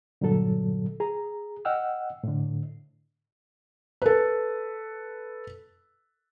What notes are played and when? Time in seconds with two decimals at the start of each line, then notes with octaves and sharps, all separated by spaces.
0.21 G2 A#2 D3 F#3 A4
1.00 G#4 A#5
1.65 D#5 F#5 G5 E6 F6
2.24 A2 D3
4.02 A4 B4